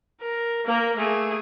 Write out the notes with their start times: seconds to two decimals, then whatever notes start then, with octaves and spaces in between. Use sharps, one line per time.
0.21 A#4
0.66 A#3 A#4
0.97 A3 G#4